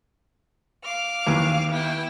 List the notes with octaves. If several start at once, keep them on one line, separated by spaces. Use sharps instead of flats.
F5 D6 F6
D#2 E3
B3 E4 G5